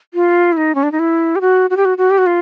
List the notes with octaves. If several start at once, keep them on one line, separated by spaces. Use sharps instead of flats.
F4
E4
D#4
C#4
D4
D#4
E4
G4
F#4
F#4
G4
F#4
F#4
G4
F#4
F4